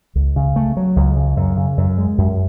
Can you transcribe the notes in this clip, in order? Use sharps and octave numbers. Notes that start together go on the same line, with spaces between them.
C#2
C#3
A3
F#3
C#2
C#3
F#2
C#3
F#2
G#3
F#2